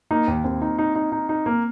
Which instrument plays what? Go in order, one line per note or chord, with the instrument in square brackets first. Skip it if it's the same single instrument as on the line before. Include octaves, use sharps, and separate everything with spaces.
[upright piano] A#3 [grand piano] D#4
[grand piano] D#2
[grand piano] D#2 [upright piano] C4
[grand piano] D#4
D#4
D#4
D#4
D#4
A#3